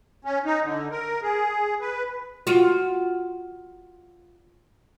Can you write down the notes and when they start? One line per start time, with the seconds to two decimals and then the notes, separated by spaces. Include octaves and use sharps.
0.25 C#4
0.45 D#4
0.64 D3
0.91 A#4
1.22 G#4
1.81 B4
2.47 F4 F#4